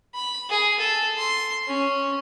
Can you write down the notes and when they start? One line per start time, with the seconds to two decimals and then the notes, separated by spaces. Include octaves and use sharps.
0.15 B5
0.50 G#4
0.79 A4
1.18 C6
1.68 C#4